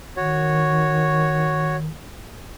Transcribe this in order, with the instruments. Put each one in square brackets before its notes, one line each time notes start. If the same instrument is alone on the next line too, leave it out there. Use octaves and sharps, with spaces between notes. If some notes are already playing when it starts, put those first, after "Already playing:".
[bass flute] D#3 [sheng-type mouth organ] F#4 C#5